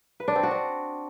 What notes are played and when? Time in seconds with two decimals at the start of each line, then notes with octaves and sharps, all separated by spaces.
0.20 B4
0.28 D4
0.36 C4
0.43 F#4
0.51 D4